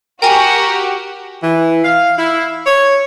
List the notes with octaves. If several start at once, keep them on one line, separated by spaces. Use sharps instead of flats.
F#4 G4 A#4 G5 G#5
E3
F5
E4
C#5